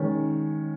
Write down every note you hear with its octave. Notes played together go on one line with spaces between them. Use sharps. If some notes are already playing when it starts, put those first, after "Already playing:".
Already playing: D#3 G#3 C#4